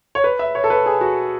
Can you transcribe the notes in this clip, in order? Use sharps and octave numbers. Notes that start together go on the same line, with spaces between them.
C#5
B4
E5
C#5
A4
B4
G#4
F#4